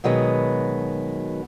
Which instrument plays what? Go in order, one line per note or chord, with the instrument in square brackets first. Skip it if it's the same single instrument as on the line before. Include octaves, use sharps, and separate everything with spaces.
[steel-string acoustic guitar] B2 D#3 F#3 G#3 B3